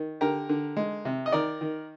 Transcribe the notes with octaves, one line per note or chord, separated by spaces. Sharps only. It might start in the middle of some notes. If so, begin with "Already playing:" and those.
Already playing: D#3
D3 G4 A#4
D3
G#3
C3
D#5
D#3 A#4 D5
D#3